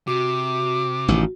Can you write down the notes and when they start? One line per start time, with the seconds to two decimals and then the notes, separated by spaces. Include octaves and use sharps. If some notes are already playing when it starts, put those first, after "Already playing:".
0.07 C3 F#4 D6
1.08 A1 D#3